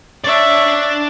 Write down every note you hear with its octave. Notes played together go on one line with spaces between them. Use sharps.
D4 C#5 D5 E5